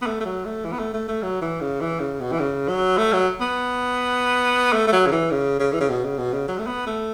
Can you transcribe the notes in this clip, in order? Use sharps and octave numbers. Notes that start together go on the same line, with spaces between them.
B3
A3
A3
F#3
A3
E3
B3
A3
A3
A3
F#3
E3
C#3
E3
C#3
B2
E3
C#3
F#3
A3
F#3
B3
A3
A3
F#3
C#3
E3
C#3
C#3
E3
C#3
B2
C#3
B2
C#3
F#3
A3
B3
A3